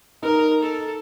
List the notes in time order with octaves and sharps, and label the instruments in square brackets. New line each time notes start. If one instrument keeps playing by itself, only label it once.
[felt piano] D#4 [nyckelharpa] A#4
[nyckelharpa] A4